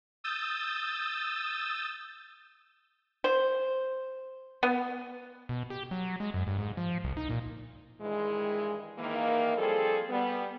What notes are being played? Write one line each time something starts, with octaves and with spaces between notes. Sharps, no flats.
D#6 E6 G6 A6
C5
B3
B2
G4
F#3
G#3
F#2
G2
G#2
F3
C2
D#4
A#2
G2 D#3 E3 G#3
G#2 D#3 E3 A#3
F3 G3 C4 G#4 A4
G3 B3